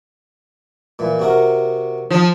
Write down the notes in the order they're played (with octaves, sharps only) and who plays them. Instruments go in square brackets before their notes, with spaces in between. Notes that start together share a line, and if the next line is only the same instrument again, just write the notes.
[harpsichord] A#2 E3
C3 F#4 A#4
[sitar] F3